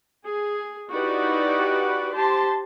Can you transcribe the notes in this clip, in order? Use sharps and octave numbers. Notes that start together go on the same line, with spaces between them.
G#4
D#4 E4 F#4 G4 B4 D5
G4 C5 A5 C6